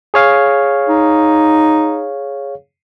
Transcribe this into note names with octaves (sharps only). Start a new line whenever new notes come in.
G#4 C#5 F5
D#4